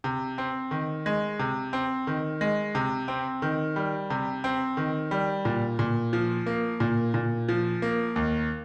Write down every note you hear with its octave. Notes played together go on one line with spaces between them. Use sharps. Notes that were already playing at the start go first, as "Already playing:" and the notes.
C3
C4
D#3
G#3
C3
C4
D#3
G#3
C3
C4
D#3
G3
C3
C4
D#3
G3
A#2
A#2
F3
A#3
A#2
A#2
F3
A#3
D#2